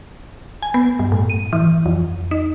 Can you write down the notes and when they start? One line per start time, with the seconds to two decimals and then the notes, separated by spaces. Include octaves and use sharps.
0.62 G#5
0.74 B3
0.99 G2
1.12 A2
1.30 D#7
1.53 E3
1.86 F2
2.31 D#4